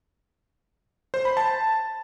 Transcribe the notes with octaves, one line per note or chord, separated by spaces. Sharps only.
C5
B5
A5